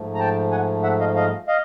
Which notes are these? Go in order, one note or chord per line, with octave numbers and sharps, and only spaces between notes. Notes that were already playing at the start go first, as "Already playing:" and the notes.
Already playing: G#2 F3 A3
A#5
G5 A5
F#5 G#5
E5 F#5
D#5 F5
D#5 F5
D#5 F5